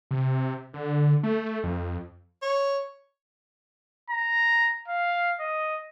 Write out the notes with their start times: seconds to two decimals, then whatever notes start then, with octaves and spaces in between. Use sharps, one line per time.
0.11 C3
0.74 D3
1.23 A3
1.63 F2
2.42 C#5
4.10 A#5
4.88 F5
5.40 D#5